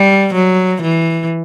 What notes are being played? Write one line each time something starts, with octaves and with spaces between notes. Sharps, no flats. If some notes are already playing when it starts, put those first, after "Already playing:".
Already playing: G3
F#3
E3